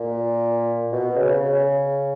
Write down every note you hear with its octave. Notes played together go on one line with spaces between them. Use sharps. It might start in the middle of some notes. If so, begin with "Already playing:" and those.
Already playing: A#2
B2
C#3
C#3